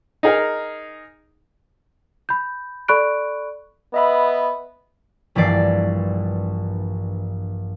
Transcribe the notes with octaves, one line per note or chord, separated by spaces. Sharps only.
D#4 G#4 A#4
B5 G6
A4 D5 B5 C#6 F#6 D7
B3 D#5 E5 B5
A#1 G2 E3 D5 C7